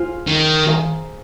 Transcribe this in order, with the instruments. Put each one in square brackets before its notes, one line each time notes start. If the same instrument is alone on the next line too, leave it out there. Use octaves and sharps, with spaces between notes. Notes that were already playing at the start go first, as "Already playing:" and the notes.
Already playing: [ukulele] F4 G#4 C5
[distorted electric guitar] D#3
[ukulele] G#4 C5 F5 A#5